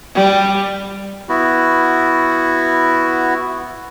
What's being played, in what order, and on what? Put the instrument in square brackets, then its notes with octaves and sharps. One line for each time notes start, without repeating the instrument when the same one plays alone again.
[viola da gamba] G3
[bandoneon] B3 E4 F#4